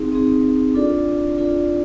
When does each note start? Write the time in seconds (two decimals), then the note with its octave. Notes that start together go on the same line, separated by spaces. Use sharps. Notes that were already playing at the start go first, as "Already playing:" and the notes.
Already playing: C4 D#4 G#4
0.12 C4 D#4 G#4
0.74 D4 F4 A4 D5
1.38 D4 F4 A4 D5